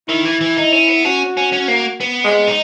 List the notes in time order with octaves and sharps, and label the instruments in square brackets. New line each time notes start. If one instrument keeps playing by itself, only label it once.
[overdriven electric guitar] D#3 [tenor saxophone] E4
[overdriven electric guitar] E3
E3
D#4
C#4
B3
[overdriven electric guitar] C#4 [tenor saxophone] F#4
[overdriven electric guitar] C#4
C#4
A#3
B3
[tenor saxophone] G#3
[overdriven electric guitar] D#4